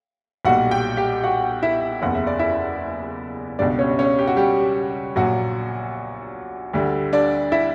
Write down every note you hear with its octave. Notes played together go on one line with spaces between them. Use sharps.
B1 A#2 G3 F#4 F#5
G4 G5
G4 G5
F#4 F#5
E4 E5
F#1 E2 C#3 F#5
E5
D5
E4 E5
C#2 B2 G3 D4 D5
C#4 C#5
C#4 C#5
G4
F#4
G3 G4
A#1 A#2 F#3 F#4
D2 D3 G3
D4 D5
E4 E5